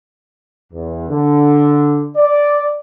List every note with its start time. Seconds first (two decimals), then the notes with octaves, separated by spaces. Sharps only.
0.73 E2
1.09 D3
2.16 D5